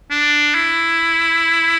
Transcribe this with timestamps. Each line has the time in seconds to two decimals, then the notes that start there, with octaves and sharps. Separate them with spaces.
0.11 D4
0.54 E4